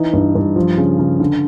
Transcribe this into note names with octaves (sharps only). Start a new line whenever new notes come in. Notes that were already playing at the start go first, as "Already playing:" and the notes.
Already playing: E3 D#4
G2
G2
F3
C#3
C#3
D3